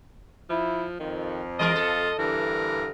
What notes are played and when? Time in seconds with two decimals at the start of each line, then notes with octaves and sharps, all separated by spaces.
0.50 F3 E4
1.00 F2 D#3
1.59 E3 G#3 F4 A#4 D#5
1.75 A4
2.19 G2 D3 E3 A#4